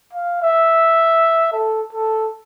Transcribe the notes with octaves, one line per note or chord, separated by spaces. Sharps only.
F5
E5
A4
A4